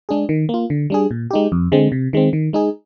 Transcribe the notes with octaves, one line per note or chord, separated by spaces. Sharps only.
G#3 D4 G#4
D#3
A#3 F4
D3
G3 D4 G#4
A#2
G#3 D#4 G4
F2
D3 G#3 C4
C3
D#3 G#3 C4
D#3
G#3 D#4 G#4